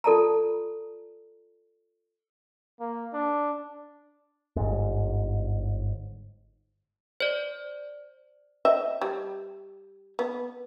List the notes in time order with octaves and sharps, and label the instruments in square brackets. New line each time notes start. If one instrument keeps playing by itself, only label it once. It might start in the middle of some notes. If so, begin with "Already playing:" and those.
[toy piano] F4 A4 D5 A5 A#5
[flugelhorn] A#3
D4
[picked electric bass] G1 G#2
[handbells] C5 D5
[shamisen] D#5 E5 G5
G3
B3